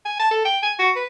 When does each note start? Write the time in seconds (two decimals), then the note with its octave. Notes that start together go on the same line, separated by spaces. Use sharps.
0.05 G#5
0.20 A5
0.31 A4
0.45 G5
0.63 G#5
0.79 F#4
0.96 B4